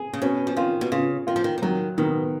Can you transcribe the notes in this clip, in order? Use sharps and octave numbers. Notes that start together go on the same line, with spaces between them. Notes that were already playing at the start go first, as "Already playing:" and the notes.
Already playing: G#4
C#3
B2 C#4
F3
D#3 F4
B2
C#3 F4
D#3 F4
F3
D#3
F3
D#3 F#3
B2 D#3